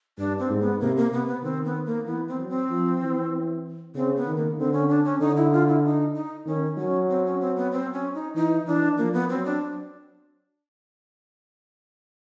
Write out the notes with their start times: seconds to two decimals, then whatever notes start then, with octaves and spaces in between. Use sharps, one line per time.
0.18 G2 D4
0.39 C4
0.50 G#2
0.60 B3
0.80 C3 A#3
0.97 A#3
1.12 C3 B3
1.27 B3
1.43 D#3 C4
1.65 B3
1.86 A#3
2.06 E3 B3
2.28 C4
2.37 F#3
2.49 C4
2.70 F3
3.01 E3
3.95 C#3 C4
4.16 B3
4.26 D#3
4.37 A#3
4.58 D3 C4
4.73 C#4
4.89 D4
5.04 C#4
5.20 D3 D#4
5.37 E4
5.52 F4
5.68 E4
5.84 D#4
6.15 D#4
6.46 D#3 C#4
6.78 F#3 C#4
7.09 C4
7.26 C#4
7.40 C4
7.56 B3
7.72 C4
7.93 C#4
8.14 D#4
8.35 E3 D#4
8.66 E3 D4
8.98 F3 A#3
9.13 B3
9.30 F#3 C4
9.45 D4